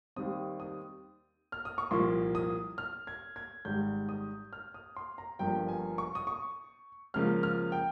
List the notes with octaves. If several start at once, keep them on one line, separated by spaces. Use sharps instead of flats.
D#2 D#3 G3 C4 D#6
D#6
F6
D#6
C#6
C2 A#2 F3 A#3 C6
D#6
F6
G#6
G#6
G#1 G#2 G3 G6
D#6
F6
D#6
C6
A#5
G1 G2 F3 A#3 G5
G#5
C#6
D#6
C#6
C#2 C#3 F3 A#3 F6
F6
G5